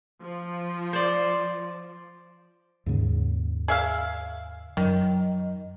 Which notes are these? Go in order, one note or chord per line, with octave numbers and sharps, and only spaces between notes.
F3
C5 D5
D#2 G#2 C#3
G#4 E5 F5
F#2 D#3 F#3